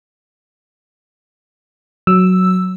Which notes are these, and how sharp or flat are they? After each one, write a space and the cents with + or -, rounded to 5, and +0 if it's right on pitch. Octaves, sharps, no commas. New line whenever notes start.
F#3 +0 E6 +0